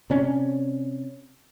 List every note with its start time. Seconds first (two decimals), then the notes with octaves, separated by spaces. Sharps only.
0.10 C3 C#4 D4